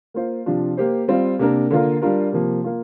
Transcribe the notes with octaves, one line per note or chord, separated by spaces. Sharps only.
A#3 F4 C5
C3 F3 D4 F4
A#3 G4 C5
G3 C4 F4
C3 A#3 D4 A#4
D3 A#3 F4 A#4
G3 D4 F4 A#4
C3 F3 A#3
A#3 F4